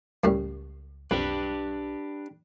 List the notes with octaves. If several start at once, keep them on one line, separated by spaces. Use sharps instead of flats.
C#2 F#2 A2 G3
B1 F2 D4 G4 B4